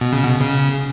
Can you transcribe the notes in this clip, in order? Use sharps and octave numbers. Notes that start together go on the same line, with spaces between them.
B2
C#3
B2
C#3